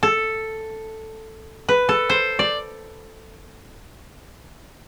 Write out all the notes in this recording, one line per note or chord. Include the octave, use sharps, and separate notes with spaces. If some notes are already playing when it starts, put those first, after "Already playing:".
A4
B4
A4
C5
D5